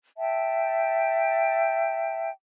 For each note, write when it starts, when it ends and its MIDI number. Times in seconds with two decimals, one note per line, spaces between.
0.17 2.29 76
0.17 2.29 79
0.17 2.29 81